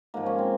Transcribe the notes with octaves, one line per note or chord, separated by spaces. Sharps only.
G#2 F3 A#3
C#4
C4